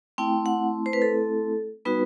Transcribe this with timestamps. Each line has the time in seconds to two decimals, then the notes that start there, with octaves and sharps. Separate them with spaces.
0.18 A3 C4 E4 G5
0.46 F#5
0.86 C5
0.93 B4
1.02 A4
1.85 G3 B3 D#4 F#4 B4